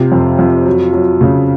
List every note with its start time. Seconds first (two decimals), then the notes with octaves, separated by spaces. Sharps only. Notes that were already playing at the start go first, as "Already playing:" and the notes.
Already playing: C3 F4
0.12 F2
0.39 F2
0.66 F#3
0.93 F#3
1.21 C#3